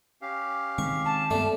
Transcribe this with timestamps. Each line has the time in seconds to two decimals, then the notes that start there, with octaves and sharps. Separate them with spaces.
0.22 C#4 G4 F5
0.78 D#3 G#3 C4 C#6
1.06 A5
1.31 G2 A3 B3 D4